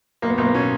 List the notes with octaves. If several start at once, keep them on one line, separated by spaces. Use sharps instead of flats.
B1 A#3
B3
B1 A#3
B3
B2 C#4